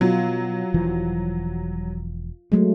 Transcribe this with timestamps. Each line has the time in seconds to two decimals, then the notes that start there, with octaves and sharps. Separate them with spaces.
0.01 B2 F#3 F4
0.74 E1 E3 F3
2.52 F#3 G#3 A3